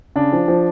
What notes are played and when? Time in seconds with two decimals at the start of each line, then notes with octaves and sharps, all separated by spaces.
0.16 C#3 D4
0.33 F3
0.48 F3